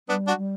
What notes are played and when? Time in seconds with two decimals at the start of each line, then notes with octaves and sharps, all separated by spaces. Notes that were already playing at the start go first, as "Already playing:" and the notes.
0.08 G3 B3 D4
0.27 D4 F#4
0.37 G3